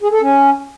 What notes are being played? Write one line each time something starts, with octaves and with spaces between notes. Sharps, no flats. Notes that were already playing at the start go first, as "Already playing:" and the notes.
G#4
A4
C#4